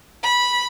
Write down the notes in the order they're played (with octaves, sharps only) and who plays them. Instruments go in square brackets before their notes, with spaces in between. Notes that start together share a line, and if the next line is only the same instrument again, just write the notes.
[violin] B5